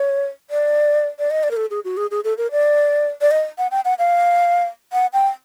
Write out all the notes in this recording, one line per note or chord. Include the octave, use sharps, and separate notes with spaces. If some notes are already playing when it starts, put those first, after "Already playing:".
Already playing: C#5
D5
D5
D#5
D5
A#4
A4
G#4
F#4
G#4
G#4
A4
A#4
D5
D5
D#5
F#5
G5
F#5
F5
F#5
G5